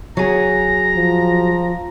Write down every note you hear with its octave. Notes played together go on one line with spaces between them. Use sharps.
F#3 G#4 A#5
F3